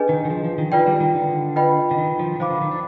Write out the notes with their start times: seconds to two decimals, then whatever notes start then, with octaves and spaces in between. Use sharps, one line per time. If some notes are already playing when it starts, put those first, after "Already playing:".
Already playing: D4 G#4 B4 D#5 G#5
0.09 D#3
0.25 D#3
0.30 F3
0.44 F3
0.58 D#3
0.72 D#3 F4 B4 D5 G5
0.87 G3
1.00 D#3
1.15 D3
1.56 F4 B4 D#5 G5 B5
1.91 D3
1.98 D#3
2.19 F3
2.35 D#3
2.40 F3 C5 F5 B5 D6
2.51 D3
2.61 D#3
2.71 D4